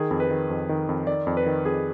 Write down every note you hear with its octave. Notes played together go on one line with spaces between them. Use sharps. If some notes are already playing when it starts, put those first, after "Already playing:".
Already playing: D#3 G#4
F2
B4
D#3
F2
D#3
F2
D#3 D5
F2
B4
D#3
F2 G#4